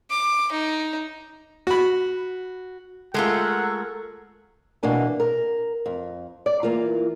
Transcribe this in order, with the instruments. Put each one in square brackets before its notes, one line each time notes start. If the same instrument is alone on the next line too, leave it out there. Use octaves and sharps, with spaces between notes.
[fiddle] D6
D#4
[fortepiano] F#4 B5
[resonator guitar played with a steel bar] G#3 A3 F4 [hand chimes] A4 [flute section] A#4 C#6 E6 [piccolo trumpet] F#5
[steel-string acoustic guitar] B2 E3 A#3 D4 G#5
A#4
F2
D5
E3 A#3 F4